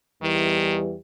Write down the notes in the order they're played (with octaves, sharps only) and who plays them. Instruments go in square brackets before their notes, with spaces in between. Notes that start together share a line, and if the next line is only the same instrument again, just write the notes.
[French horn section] E2 E3 G3 [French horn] D#3